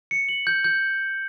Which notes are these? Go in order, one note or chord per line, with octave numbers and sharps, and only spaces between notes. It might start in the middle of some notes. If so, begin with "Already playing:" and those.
C#7
F#7
G6
G6